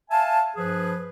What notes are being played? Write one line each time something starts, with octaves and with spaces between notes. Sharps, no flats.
E5 F5 G#5 A5
G2 F3 G#4 B4